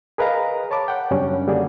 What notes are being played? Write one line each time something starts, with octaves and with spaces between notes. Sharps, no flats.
G#4 A#4 B4 D#5 F5 A#5
C#5 A5 B5 D6
F#5 G5
F#2 C#3 G3 C#4 D4
D3 G3 A#3 F#4 G#4 D5